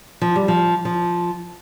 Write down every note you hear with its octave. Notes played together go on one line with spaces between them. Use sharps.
F3
G3
F3
F3